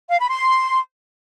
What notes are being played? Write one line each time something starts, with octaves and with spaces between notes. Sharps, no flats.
F5
B5
C6